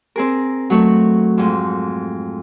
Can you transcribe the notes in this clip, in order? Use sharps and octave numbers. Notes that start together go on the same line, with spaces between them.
C4 G#4 A#4
F#3 A3
F2 G#2